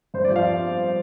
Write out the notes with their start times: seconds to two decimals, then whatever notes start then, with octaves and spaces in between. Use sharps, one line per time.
0.14 G2 C5
0.25 D5
0.30 F3
0.36 F5